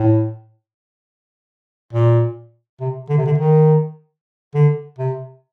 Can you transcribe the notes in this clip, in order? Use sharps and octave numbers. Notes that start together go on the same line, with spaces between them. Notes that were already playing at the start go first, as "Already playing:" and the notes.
Already playing: A2
A#2
C3
D3
C3
D3
D#3
D3
C3